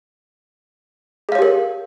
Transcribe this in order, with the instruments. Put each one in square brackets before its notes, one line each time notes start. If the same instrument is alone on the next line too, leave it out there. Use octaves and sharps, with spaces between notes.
[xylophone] G#4
F5
C#5
G4
A#4